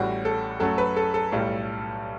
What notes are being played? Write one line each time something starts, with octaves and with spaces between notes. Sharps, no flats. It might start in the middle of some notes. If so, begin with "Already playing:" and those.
Already playing: A1 A2 G3 F#4
A4
F#2 F#3 A3 A4
B4
A4
A4
B1 A2 G3